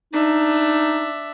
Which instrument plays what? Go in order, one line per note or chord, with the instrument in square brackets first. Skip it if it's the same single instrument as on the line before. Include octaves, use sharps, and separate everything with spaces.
[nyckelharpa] D4 E5 [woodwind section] D#4